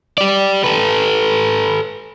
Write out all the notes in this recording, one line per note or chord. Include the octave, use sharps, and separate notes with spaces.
G4 D5
A4 B4